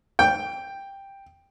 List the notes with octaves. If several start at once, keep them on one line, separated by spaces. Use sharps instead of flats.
G5